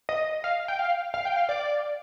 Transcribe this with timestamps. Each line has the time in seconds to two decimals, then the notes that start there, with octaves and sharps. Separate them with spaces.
0.09 D#5
0.44 F5
0.68 G5
0.79 F5
1.14 F5
1.25 G5
1.36 F5
1.49 D5